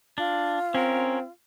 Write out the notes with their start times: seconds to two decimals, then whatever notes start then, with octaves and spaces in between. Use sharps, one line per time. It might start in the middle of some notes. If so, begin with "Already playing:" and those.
0.18 D4 F4
0.75 C4 C#4 A#4